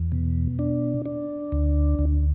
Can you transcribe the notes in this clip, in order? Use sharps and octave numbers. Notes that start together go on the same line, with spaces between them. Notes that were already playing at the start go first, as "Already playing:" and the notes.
Already playing: E2
B2
D4
D4
D2
D2